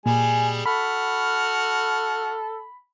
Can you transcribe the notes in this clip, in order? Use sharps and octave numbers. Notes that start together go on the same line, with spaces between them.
A#2 G3 G#3 G#5
F#4 A4 B5 F6